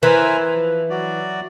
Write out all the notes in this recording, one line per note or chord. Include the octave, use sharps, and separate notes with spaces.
E3 A#4 C5 G#5
F3
F#3 F#4 D5